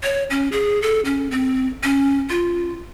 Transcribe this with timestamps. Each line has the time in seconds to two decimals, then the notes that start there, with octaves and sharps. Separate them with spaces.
0.03 C#5
0.30 C#4
0.52 G#4
0.82 A4
1.05 C#4
1.31 C4
1.84 C#4
2.30 F4